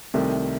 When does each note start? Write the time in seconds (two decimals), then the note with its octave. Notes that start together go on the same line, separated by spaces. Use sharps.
0.14 C2 C3 D#3 A3